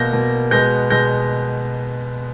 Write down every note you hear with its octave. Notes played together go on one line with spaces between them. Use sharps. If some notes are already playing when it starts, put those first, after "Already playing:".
Already playing: B2 A#3 G6 A#6
B2 A#3
B2 G#3 B3 G6 A#6
B2 G#3 B3 G6 A#6